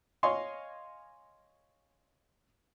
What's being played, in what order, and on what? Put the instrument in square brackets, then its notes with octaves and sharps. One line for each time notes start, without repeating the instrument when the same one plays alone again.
[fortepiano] C#5 D#5 F5 G#5 C6 C#6